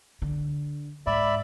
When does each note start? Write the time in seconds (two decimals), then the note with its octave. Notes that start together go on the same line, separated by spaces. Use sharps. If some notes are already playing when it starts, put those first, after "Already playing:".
0.22 D3
1.07 G#2 D5 E5 B5